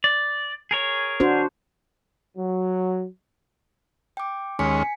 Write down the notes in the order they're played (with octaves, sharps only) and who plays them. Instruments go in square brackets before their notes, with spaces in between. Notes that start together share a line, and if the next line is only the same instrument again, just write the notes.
[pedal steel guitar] D5
G#4 A#4 C#5
[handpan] D4 F#4 C5
[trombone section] F#3
[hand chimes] G5 D6
[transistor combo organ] D#2 G#3 C#4 [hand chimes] G#5 B6 C#7